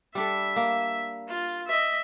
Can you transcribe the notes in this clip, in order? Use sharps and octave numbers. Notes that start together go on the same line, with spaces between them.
G3 D4 A4 E5
A#3
F4
D#5 E5